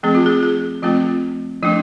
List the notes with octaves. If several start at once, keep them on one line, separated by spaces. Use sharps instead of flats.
F3 A3 C4 G#4
F4
G#4
G#4
F3 A3 C4 F4
F3 A3 D4 E4